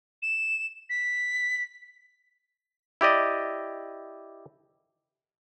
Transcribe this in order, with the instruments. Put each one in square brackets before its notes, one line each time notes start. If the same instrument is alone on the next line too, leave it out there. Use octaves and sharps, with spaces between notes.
[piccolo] E7
B6
[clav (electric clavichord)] E4 G4 D5 D#5